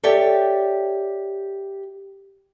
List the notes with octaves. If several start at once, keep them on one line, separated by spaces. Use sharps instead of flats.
G4 A4 C#5 D5 E5 G5